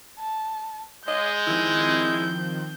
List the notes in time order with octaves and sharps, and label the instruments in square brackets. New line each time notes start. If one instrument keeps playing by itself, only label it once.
[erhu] A5
[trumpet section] G#3 [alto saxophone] D#5 [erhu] G6
[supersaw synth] D#3 F3 C4 [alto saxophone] E4